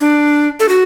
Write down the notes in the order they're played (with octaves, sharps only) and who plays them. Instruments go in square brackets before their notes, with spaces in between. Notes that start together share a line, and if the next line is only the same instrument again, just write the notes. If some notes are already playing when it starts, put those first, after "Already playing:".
[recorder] D4
A4
F#4